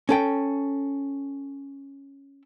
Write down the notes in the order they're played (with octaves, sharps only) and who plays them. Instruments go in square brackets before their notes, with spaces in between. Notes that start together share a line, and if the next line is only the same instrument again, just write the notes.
[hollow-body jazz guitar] C#4 A4 G5